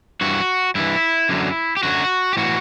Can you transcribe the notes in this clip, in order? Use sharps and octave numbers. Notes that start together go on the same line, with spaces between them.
G2 E3 F#4
G2 E3 E4
F#2 D3 F#3
G4
F#2 D3 F#3 F#4
G4
A2 E3 F#4